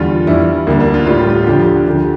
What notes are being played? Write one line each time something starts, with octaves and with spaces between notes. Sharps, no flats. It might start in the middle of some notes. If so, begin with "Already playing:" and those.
Already playing: E2 D3 G3 F4
G2 E3 G3 E4
D2 D3 G3 A#3
D4
F4
A2 G3 F4
G4
F4
D2 D3 F3 G4
D2 D3 F3 G4